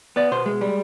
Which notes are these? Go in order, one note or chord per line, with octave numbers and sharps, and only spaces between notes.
B3 D5
B2 C5
G#3
G3